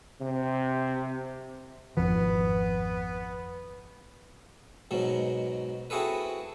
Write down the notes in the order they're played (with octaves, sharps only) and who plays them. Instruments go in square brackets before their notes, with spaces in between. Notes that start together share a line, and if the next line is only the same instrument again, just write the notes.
[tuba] C3
[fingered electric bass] G#1 F2 F3 [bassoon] B3
[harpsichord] G#2 B2 F#3
C4 E4 F#4 G#4 A4 B4